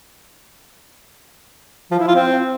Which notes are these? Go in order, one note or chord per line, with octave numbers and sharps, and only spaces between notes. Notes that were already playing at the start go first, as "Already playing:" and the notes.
F3
E4
F4
C4